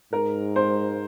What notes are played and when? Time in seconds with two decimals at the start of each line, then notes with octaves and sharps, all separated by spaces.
0.12 G#2 A#4
0.56 C5